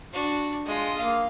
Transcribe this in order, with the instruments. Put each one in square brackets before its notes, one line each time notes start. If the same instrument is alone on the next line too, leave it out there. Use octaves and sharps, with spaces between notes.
[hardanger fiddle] D4 F#4
[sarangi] G#3 [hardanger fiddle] F4 D#5
[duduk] A#3 [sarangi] F5